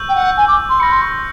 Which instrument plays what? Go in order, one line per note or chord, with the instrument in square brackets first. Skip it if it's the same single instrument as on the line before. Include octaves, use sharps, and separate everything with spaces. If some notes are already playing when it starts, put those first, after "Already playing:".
Already playing: [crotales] C#6 E6 G6
[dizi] G5
F#5
G#5
D6
C6
[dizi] B5 [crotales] C#7
[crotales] F6 A#6
[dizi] C6
C#6